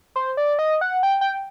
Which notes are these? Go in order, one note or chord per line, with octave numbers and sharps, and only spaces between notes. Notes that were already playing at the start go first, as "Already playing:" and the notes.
C5
D5
D#5
F#5
G5
G5